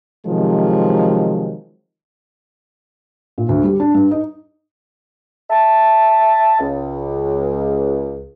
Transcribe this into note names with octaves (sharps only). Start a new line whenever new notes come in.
C3 D#3 F3 F#3 G#3
A#2
D2
G3
D4
G2
D#4
E5 A5
C#2